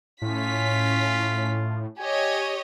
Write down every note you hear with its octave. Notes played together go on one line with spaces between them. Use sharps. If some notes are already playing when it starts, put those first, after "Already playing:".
A2 C#4 F4 B6
G4 C#5 D#5 G#5